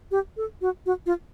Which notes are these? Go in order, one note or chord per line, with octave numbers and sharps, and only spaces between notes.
G4
A4
F#4
F#4
F4